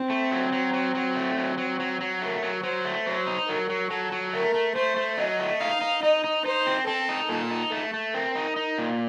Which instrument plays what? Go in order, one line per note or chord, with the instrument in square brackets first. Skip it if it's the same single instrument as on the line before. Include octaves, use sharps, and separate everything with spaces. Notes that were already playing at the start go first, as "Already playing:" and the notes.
Already playing: [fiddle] C4
[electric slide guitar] A3
F#3
F#3
F#3
F#3
A3
F#3
F#3
F#3
F#3
[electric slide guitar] A3 [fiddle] A#4
[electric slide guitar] F#3
[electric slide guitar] F#3 [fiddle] C5
[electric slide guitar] A3
[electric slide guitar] F#3 [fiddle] C5
[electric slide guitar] D#4
[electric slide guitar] F#3 [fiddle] A#4
[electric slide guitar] F#3
[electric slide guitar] F#3 [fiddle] A4
[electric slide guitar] F#3
[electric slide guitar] A3 [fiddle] A#4
[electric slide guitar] A3
[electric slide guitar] A3 [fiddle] C5
[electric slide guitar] A3
[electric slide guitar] F#3 [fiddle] D#5
[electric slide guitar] A3
[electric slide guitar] D#4 [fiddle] F5
[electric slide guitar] D#4
[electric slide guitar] D#4 [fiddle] D#5
[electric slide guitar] D#4
[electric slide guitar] D#4 [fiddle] C5
[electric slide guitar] C4
[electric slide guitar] C4 [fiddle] A4
[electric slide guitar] D#4
[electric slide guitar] A#2 [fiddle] A4
[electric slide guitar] D#4
[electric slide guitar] A3 [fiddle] A4
[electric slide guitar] A3
[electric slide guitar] C4 [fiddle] A#4
[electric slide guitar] D#4
D#4
A#2